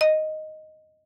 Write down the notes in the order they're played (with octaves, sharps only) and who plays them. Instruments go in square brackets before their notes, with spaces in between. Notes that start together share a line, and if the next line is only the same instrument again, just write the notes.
[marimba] D#5